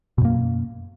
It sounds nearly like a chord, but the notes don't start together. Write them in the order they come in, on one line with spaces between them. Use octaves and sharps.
B2 F#2 A#3